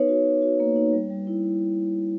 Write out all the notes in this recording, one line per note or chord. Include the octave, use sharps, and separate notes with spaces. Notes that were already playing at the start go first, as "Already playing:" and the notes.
Already playing: B3 D#4 B4 C#5
F#4
F#4
F#4
A#3
D#4
G3
G3
E4